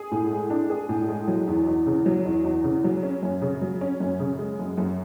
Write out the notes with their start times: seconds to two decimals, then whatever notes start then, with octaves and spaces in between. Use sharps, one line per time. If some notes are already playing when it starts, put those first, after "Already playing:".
Already playing: G#4
0.12 A2
0.31 G#3
0.50 D4
0.70 G#4
0.89 A2
1.09 G#3
1.28 F#3
1.48 E2
1.67 E2
1.86 C#3
2.06 F#3
2.25 E2
2.44 E2
2.64 C#3
2.84 F#3
3.03 C#4
3.22 F#2
3.42 C#3
3.62 F#3
3.81 C#4
4.00 F#2
4.20 C#3
4.39 G#3
4.59 F#2
4.78 F#2